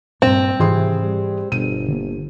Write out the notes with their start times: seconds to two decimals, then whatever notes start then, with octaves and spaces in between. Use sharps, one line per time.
0.22 G2 A#2 C4
0.59 G#2 C3 E3 G#4 C6
1.02 G3
1.52 G1 B2 D#7
1.88 D3 A#3